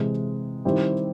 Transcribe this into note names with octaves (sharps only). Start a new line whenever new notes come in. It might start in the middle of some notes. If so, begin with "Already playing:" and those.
Already playing: C3 E3 G#3 C4
D#3 G3 C4 E4 G4